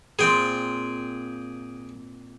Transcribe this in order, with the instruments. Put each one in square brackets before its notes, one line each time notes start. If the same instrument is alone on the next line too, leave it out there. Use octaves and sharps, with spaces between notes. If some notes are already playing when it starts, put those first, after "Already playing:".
[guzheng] A#2 C4 F4 [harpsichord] G#4 G5